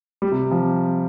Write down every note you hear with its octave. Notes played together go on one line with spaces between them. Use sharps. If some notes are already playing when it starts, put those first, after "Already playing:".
G3
C3
F3